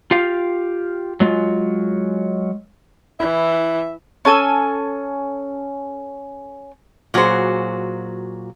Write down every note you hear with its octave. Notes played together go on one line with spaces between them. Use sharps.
F4 G4 F5
F#3 G#3 F4
E3 E4 E5
C#4 A4 G#5 E6
A#2 F#3 F#4 G#4 C5